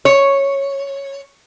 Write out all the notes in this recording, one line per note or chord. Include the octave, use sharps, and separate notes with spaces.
C#5